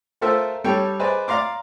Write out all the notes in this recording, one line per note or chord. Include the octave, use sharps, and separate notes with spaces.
A3 F4 A4 A#4 C5 E5
G3 A4 C#5 G5
G#4 B4 C5 D5 D#5
D5 F5 A#5 C6 D6